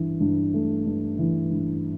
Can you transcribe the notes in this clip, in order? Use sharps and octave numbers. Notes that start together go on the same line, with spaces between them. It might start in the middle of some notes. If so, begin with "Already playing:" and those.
Already playing: G2 E3
G2
A3
G2
E3
G2